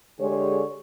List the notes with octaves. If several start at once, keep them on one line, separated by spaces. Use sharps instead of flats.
D3 G#3 G4 G#4 C#5